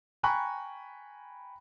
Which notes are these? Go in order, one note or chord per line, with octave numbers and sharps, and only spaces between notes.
G5 G#5 A#5 B5 C#6 F#6